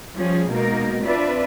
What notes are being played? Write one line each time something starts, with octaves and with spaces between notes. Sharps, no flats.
F3 G3 C#4 G#4
B2 G#3 A#3 D#4 A#4
C4 D4 F4 B4 D5 E5